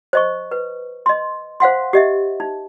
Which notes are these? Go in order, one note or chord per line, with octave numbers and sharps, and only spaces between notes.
C5 D#5 C#6
B4
D#5 C6
C5 F5 F#5 C6
G4 D#5 E5
D#4